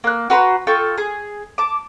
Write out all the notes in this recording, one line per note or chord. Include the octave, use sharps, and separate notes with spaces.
A#3 F#6
F#4 B4 A#5 C6
F4 A4 G5 C#6
G#4
A5 D6